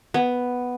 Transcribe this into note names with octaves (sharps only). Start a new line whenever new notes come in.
B3